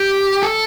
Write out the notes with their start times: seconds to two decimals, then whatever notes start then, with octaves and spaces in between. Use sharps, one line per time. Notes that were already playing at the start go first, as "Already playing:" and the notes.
Already playing: G4
0.43 A4